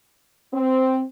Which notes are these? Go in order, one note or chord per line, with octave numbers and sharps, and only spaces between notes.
C4